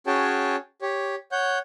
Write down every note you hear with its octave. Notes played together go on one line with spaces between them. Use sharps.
C#4 F#4 G#4 C#5 G5 A5
G4 C#5
C#5 F#5 G6